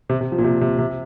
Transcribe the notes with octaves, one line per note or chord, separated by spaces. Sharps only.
C3
C3
F3
A#2
C3
C3
C3